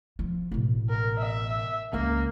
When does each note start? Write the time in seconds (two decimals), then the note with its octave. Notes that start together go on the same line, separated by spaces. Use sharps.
0.19 F3
0.52 A1 B2
0.90 A#4
1.19 E5
1.93 C#2 A#3 C#4